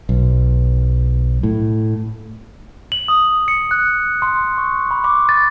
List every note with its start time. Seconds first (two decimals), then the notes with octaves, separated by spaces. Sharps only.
0.09 B1
1.43 A2
2.92 F#7
3.08 D#6
3.48 C#7
3.71 F#6
4.22 C6
4.58 C#6
4.91 B5
5.04 D6
5.29 A6